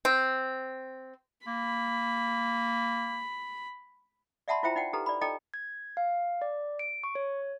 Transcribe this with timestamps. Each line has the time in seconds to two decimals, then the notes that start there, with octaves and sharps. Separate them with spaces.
0.05 C4
1.47 A#3 B5
4.48 D5 E5 F#5 A5 B5 C6
4.63 E4 F4 C5 E5 G5 A#5
4.76 D#4 D5 F#5 G5
4.93 D#4 G4 A4 B4 A#5
5.06 D5 B5
5.21 D#4 A4 D5 D#5 G5 A#5
5.54 G#6
5.97 F5
6.42 D5
6.79 D7
7.04 C#6
7.15 C#5